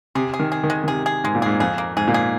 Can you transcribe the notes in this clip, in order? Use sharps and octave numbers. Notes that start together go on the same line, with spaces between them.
C3 G#4
G#4
D#3
G#4
D#3
G#3
D#3
C3 G#4
G#4
G#2 G#3
A#2
G#2 G#4
F2 G#4
A#3
G#2 G#4
A#2
G#4